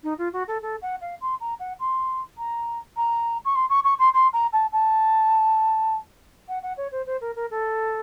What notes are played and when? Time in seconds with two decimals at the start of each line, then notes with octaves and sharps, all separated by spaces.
0.03 D#4
0.18 F4
0.33 F#4
0.48 A4
0.62 A4
0.82 F#5
1.01 F5
1.21 C6
1.40 A#5
1.59 F#5
1.79 C6
2.38 A#5
2.97 A#5
3.45 C#6
3.55 C6
3.69 C#6
3.84 C#6
3.99 C6
4.14 C6
4.33 A#5
4.53 A5
4.72 A5
6.48 F#5
6.63 F#5
6.77 C#5
6.92 C5
7.06 C5
7.21 A#4
7.36 A#4
7.51 A4